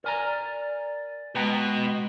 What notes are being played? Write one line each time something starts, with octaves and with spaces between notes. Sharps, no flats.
A#4 D5 G#5 A#5
B2 G#3 B4 G5 A#5